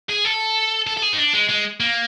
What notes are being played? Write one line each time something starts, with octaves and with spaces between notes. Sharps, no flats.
G#4
A4
A4
A4
G#4
D#4
D4
G#3
G#3
A#3